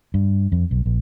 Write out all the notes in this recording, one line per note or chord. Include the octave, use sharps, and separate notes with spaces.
G2
F2
B1
A#1